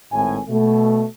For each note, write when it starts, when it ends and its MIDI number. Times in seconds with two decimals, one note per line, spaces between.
0.12 0.38 32
0.12 0.38 45
0.12 0.38 80
0.48 1.03 47
0.48 1.03 57